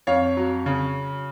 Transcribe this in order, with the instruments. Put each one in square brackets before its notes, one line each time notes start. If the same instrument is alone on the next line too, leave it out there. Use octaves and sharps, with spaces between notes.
[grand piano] F2 C#5 F5
F#3
C#3